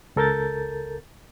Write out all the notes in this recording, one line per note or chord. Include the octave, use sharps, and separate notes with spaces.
C#2 A4 A#4 G6 A6